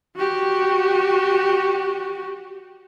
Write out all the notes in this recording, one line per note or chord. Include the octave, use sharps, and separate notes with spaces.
F#4 G4